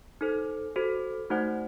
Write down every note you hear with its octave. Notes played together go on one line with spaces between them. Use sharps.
D#4 A4 C5
F#4 A4 C5
A3 D#4 F#4 C5 F#5